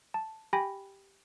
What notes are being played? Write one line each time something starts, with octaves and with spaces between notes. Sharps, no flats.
A5
G4 G5 G#5 B5 A#6